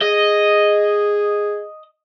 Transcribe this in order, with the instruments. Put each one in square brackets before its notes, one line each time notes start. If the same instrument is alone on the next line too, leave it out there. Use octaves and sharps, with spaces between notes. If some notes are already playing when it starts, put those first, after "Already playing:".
[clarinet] G#4 [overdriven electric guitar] D#5